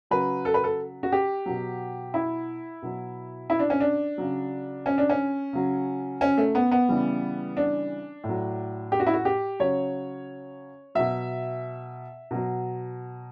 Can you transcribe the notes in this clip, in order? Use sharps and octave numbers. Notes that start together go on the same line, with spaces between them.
C#3 F#3 B4
A4
B4
A4
F#4
G4
B2 F#3
E4
B2 F#3
E4
D4
C#4
D4
C#3 F#3
C#4
D4
C#4
C#3 F#3
C#4
A3
B3
B3
C#3 E3 G3
D4
A2
F#3
G4
F#4
E4
F#4
G4
C#3 F#3 C#5
B2 F#3 E5
B2 F#3